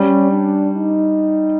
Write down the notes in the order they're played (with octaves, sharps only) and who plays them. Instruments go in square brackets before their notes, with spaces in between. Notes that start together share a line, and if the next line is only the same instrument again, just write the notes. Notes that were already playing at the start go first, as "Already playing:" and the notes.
Already playing: [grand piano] G3 [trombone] C#4
[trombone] D4
D#4